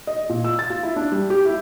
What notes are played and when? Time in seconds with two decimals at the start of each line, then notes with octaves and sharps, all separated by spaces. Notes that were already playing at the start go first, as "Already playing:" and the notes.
0.07 D#5
0.29 A#2
0.44 E6
0.59 A6
0.70 F4
0.83 E4
0.96 D4
1.12 G3
1.30 G4
1.45 E4